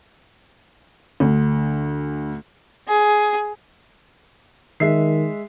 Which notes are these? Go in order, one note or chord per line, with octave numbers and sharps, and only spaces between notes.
D2
G#4
D#3 G#3 E5 C7